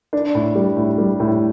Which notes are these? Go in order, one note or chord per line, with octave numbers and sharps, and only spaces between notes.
D4
A2
G3
A2
G3
A2